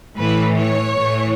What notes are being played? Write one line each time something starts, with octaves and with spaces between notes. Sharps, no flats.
A2 E3 B4
C#5
A2 E3